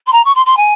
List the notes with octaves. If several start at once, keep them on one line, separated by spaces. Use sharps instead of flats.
C6
A#5
C#6
C6
C6
G#5